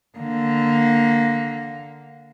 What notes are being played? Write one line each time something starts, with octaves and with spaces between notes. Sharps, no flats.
D3 A#3